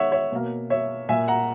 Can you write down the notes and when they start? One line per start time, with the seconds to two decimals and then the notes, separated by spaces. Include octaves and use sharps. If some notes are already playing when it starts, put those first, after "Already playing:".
Already playing: D#3 G#3 B3 C#5 E5 F#5
0.12 C#5 E5
0.32 B2 A#3
0.70 C#5 E5
1.09 A#2 A#3 E5 G#5
1.28 F#5 A#5